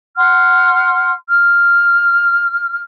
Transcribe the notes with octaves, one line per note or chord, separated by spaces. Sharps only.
F#5 C6 F6
F6